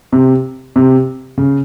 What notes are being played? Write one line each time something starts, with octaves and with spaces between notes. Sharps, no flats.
C3
C3
C#3